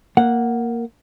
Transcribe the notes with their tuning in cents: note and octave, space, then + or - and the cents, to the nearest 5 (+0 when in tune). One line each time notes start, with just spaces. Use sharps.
A#3 +0 F#5 +0